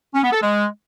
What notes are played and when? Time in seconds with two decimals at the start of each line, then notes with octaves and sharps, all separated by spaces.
0.14 C#4
0.23 B3
0.33 A4
0.42 G#3